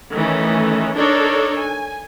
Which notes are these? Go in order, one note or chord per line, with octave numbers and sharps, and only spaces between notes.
D#3 E3 A3 C#4
D4 D#4 A4 A#4 C#5 D5
G#5